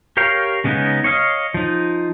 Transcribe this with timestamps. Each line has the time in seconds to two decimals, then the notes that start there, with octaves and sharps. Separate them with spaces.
0.17 G4 A#4 C#5 F5 G5
0.64 C#3 G#3 B3 C#4 D#4
1.04 C#5 D#5 F5
1.54 F3 D#4